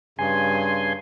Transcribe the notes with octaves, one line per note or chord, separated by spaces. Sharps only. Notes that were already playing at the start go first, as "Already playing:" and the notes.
G2 C#3 G#5 C6